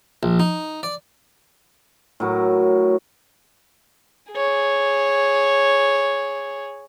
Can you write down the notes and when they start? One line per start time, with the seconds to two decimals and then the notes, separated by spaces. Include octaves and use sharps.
0.23 A#1
0.40 D#4
0.83 D5
2.20 A2 F#3 A#4
4.32 G#4 C#5